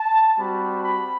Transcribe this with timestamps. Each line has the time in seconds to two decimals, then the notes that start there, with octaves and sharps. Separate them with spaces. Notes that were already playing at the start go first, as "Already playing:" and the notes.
Already playing: A5
0.38 G3 C4 F#4 B5
0.83 B5